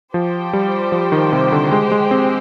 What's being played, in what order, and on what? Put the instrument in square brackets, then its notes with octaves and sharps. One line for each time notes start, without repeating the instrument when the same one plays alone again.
[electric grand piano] F3 [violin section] G4 C5 G5
[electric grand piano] G3
F3
D#3
C3
D3
G#3
G#3
C4